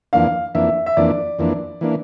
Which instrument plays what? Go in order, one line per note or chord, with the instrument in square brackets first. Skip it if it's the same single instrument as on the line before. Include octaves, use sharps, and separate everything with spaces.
[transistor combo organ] F2 E3 A#3 D4 [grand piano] F5
[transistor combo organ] F2 E3 A#3 D4 [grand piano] E5
[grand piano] E5
[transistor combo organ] F2 E3 A#3 D4 [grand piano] D5
[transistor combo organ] F2 E3 A#3 D4
E3 A#3 D4